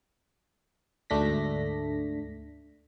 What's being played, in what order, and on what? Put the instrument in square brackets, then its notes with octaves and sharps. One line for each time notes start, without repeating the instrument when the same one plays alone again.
[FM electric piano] D2 G#2 A3 D4 A#6 B6